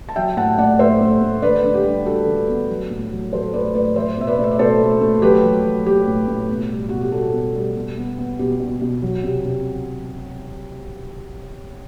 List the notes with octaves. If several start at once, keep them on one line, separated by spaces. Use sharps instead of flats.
A5
F#3 E5 G5
A2 F#5 A5
A3 D5 F#5
A2 C5 E5
A3
A3
D3 B4 D5
D3
G4
G3
G3 F#4 A4
D3
B3
F#3
A2
F#3
F#3 A4 C5
A3 B4 D5
A2 B4 D5
F#3 C5 E5
B2 E5
B4 D5
A3
E5
D5
B2 A4 C5
A3
A3
F#3 G4 B4
F#3
F#3
F#3 G4
A2
A2
B2
G3
B2 F#4
G4
G3 F#4 A4
B2
G3
B2
B3
B3
B2 G4
B2
B2
F#3
C3
C3